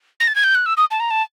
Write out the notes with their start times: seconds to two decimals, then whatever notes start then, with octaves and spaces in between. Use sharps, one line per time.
0.20 A#6
0.27 A6
0.35 G#6
0.44 G6
0.55 F#6
0.66 E6
0.77 D#6
0.91 A5
1.00 A#5
1.10 A5